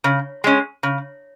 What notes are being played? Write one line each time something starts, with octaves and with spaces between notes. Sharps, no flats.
C#3
G#3 C#4
C#3